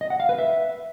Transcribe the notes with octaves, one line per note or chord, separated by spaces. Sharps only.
D#5
F#5
F5
B4
E5